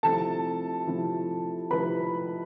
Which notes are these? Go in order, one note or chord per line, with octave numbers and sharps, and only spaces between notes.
C3 F3 A3 C4 E4 A4 A5
C3 F3 A3 C4 E4
C3 F3 A3 C4 E4 B4 B5